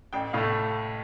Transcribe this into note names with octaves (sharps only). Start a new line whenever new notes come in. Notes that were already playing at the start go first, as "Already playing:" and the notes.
A1 G5
A2 A3 F5